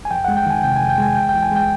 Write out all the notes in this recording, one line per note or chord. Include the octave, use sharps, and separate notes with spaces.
G#5
F2 G5
G#3 F#5
G5
D#3 G#5
C3 G5
F2 G#5
G5
G#3 G#5
E2 G5
E2 G5
G#5
G#3 G5